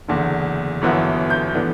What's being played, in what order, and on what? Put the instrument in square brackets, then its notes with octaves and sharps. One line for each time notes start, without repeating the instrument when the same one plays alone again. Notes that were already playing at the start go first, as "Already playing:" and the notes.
[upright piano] F#1 E2 D3
G1 F#2 E3 B3 E4
G6
A2 E3 B3 D4